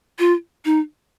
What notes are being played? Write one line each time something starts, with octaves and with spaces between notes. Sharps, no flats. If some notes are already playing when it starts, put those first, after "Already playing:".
F4
D#4